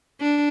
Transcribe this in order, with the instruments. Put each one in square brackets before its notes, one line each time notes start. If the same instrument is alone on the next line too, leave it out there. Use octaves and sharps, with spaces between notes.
[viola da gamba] D4